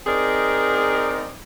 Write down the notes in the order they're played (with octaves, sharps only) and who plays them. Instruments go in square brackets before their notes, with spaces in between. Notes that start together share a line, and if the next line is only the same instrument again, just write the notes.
[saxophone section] C4 D#4 G#4 A#4 D5